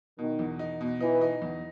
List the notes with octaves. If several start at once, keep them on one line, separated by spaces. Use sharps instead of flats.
B2 D#3
E2
D#4
B2
E3 D#4
D#4
E2